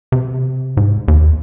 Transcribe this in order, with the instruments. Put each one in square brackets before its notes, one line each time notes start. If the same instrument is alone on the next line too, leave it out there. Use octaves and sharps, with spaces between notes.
[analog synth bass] C3
G#2
D#2